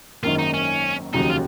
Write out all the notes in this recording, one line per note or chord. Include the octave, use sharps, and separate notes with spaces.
G#1 F#2 D#3 A#3 F4
D#4
C#4
F1 D#2 C#3 F#3 D#4
F4